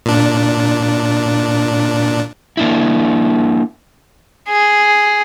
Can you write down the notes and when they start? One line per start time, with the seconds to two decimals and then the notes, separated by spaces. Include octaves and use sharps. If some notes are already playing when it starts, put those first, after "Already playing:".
0.06 A#2 D4
2.57 A#3 D4 E4
4.48 G#4